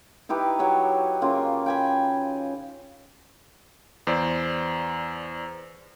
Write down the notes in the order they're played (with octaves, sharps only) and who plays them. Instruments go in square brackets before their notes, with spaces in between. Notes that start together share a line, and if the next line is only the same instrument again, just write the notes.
[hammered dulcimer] D#4 E4 G4 B4
F#3 G4 C#5
C#3 A#3 F4
G5 G#5 B5
[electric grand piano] E2 C5 D5